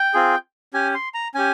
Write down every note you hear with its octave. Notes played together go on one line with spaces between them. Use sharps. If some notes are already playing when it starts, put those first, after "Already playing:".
Already playing: G5
C4 F4 G#4
C#4 G4 G#5
C6
A#5
C#4 G4 G#5